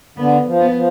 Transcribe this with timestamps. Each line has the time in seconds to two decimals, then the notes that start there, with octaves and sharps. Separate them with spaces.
0.17 D3 B3
0.46 F3
0.60 B3
0.75 F3